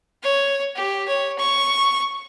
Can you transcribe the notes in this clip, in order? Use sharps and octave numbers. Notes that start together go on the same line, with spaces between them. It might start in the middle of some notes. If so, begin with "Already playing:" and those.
C#5
G4
C#5
C#6